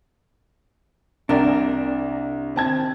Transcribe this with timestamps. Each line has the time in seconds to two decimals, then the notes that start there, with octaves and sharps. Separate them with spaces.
1.29 C2 D4 A#4
2.56 C4 A5 G#6